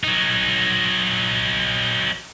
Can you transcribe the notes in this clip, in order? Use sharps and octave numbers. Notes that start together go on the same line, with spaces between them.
F#3 D#4